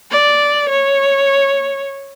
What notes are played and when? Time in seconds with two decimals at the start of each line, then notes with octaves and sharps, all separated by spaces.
0.11 D5
0.69 C#5